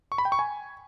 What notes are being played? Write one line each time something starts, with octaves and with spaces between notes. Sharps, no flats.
C#6
B5
G5
C#6
G#5